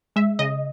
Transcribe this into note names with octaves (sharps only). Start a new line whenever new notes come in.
G#3 E5
C#3 D#5